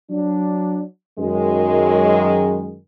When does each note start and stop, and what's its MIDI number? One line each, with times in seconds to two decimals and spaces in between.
0.11 0.83 54
0.11 0.83 62
1.19 2.77 42
1.19 2.77 51
1.19 2.77 56